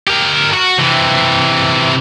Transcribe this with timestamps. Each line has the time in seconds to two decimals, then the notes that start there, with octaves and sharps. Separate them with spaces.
0.07 G4 A#4
0.54 F#4
0.79 C3 E3